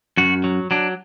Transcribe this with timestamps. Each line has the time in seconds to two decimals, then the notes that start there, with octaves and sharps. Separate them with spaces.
0.17 F#2 F#4
0.44 F#3
0.71 F#3 D4